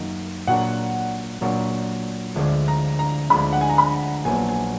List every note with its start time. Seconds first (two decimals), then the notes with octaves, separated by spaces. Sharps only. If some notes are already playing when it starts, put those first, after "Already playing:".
Already playing: F#2 D#3 A#3 D#4
0.47 A#2 F#3 D4 F#4 A#4 F#5
1.41 A#2 F#3 D4 F#4 A#4
2.36 D2 D3 F3 G#3 D4
2.68 A#5
2.99 A#5
3.30 D2 D3 F3 G#3 D4 B5
3.53 F#5
3.61 G#5
3.70 A#5
3.78 B5
4.25 A#1 A#2 F#3 B3 G#5
4.49 G#5